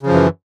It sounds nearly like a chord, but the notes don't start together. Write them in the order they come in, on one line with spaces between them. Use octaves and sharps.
C#3 F3 F#2 E3